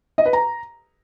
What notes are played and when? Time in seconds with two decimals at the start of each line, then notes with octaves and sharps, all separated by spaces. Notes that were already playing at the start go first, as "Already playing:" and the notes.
0.18 D#5
0.26 B4
0.33 A#5